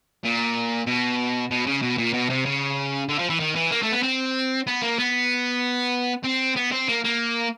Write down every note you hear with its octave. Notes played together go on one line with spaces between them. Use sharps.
A#2
B2
B2
C#3
B2
A#2
B2
C3
C#3
D3
F3
E3
D#3
E3
A#3
A3
B3
C4
B3
A#3
B3
C4
B3
C4
A#3
A#3